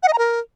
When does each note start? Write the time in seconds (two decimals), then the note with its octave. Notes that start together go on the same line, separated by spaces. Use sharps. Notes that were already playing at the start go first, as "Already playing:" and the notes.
0.03 F#5
0.08 D#5
0.13 A#5
0.18 A#4